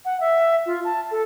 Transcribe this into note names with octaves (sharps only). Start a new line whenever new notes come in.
F#5
E5
F4
A5
A4